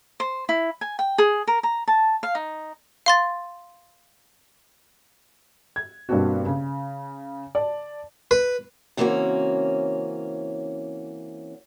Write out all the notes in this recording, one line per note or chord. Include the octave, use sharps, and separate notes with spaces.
C5
E4
G#5
G5
G#4
A#4
A#5
A5
F5
D#4
F5 C6 A6
G#6
G2 B2 A#3 C4 D4 F#4
C#3
D5 A5
B4
C#3 E3 A#3 C4 C#4 F#4